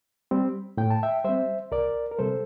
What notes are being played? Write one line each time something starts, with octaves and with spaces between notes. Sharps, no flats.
G3 C4
A2 G5
A5
E5 G5
G3 C4 C5 E5
C2 A#4 D5
A#4
C3 G3 A4 C5